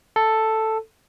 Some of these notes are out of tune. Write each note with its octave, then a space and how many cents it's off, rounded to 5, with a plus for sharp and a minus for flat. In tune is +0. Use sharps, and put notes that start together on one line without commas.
A4 +5